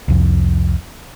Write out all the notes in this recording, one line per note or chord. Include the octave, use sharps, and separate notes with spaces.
C2 F2